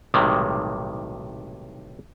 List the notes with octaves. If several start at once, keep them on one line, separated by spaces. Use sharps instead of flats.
B1 A2 C3 D#3 G3 G#3